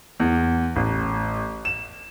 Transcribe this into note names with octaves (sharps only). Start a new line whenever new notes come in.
E2
A1
E7